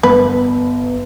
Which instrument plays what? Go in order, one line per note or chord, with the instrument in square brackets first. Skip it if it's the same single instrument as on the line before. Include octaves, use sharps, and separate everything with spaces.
[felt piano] G1 [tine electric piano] B3 [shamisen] B4